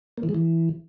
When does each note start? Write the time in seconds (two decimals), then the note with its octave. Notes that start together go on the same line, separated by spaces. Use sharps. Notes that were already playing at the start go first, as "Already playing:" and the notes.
0.18 A#3
0.23 E3
0.29 G#3
0.35 E3